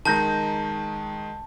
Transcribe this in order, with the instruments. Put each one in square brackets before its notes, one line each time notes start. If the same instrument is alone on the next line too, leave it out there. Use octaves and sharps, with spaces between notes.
[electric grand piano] D#3 G#3 [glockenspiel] A5 [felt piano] A#5 G6 A#6